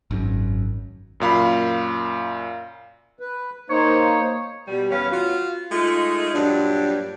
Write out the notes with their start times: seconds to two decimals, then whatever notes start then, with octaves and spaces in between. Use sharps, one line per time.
0.11 G#1 F#2
1.20 F#2 A#2 F5 B5
3.19 B4
3.70 A#3 D#4 C5 C#5
4.68 B2 G3
4.90 E2 C#4 B4 C#5 F5
5.11 F4 F#4
5.71 G#3 A3 D#4 F4
6.34 G2 A#2 F#3 D4